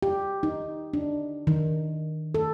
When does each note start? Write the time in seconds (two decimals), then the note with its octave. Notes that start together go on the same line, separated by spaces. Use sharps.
0.03 G4
0.43 D#4
0.94 D4
1.47 D#3
2.34 A4